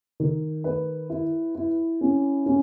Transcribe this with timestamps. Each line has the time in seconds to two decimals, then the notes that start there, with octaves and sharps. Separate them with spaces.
0.20 D#3
0.64 B4
1.10 E4
1.55 E4
2.01 C#4
2.46 C#4